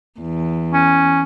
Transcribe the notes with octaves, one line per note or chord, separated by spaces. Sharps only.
E2
C#4